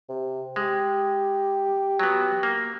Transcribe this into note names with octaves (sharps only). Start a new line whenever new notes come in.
C3
G#3 G4
F#3 B3
A#3